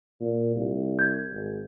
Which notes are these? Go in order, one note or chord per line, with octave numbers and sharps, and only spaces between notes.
A#2
C2
G6 G#6
G#1